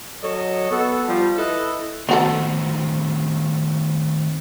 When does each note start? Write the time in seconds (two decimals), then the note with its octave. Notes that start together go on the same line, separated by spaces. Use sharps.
0.22 F#3 A4 C#5 D#5
0.70 B3 F#4 A4
1.06 F3 G3
1.38 E4 A4 B4 D#5
2.09 D#3 A3 B3 C4 F#4 A4